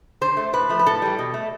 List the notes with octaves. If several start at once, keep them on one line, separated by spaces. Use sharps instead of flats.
D3 C5
A3
A2 B4
F3 A3
B4
A2 A4
E3 G3
B2
A3